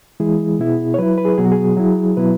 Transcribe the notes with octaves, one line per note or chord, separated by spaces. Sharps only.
E3 G#3 E4 G#4
B2 B3 E4
C#5
F#3 E4 B4
B4
G#4
B2 F#3 B3 G#4
F#4
G#4
F#3 E4
B2 F#3 B3 E4 B4